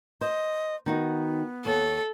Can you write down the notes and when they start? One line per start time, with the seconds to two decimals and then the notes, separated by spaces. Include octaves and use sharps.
0.21 C5 D#5
0.86 D#3 B3 D#4 F#4
1.65 D#2 A4 C#5